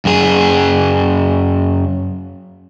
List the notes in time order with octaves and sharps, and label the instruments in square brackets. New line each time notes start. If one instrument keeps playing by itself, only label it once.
[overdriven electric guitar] F#2 G#4